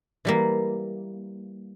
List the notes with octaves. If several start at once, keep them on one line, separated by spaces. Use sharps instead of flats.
E3 G3 A#3